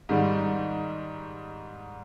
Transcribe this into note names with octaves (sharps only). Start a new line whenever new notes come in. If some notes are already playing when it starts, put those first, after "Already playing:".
G#2 D#3 G3